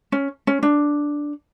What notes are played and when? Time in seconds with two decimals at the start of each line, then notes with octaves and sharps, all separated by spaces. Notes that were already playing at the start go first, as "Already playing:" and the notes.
0.12 C#4
0.47 C#4
0.63 D4